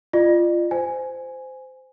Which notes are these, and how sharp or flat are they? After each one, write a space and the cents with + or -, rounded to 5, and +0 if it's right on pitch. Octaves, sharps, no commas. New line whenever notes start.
F4 -15 D5 +45
C5 -20 G#5 +0